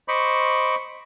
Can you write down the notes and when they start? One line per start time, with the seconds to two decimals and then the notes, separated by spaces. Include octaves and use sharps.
0.08 C5 D#5 B5 C#6 D6